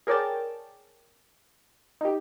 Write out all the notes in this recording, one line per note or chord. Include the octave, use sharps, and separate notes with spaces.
G#4 A#4 C#5 D5 G5 A5
D#4 G4